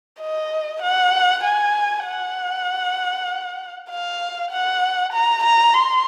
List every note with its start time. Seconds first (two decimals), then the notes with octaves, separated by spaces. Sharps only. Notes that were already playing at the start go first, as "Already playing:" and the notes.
0.21 D#5
0.82 F#5
1.44 G#5
2.05 F#5
3.90 F5
4.51 F#5
5.13 A#5
5.44 A#5
5.73 C6